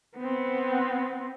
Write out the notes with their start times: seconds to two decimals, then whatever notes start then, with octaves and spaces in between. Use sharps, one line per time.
0.18 B3 C4